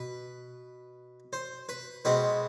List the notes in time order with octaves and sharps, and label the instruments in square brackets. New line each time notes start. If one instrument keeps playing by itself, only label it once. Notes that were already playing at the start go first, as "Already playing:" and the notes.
Already playing: [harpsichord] B2 B4
C5
B4
B2 G#3 C4 B4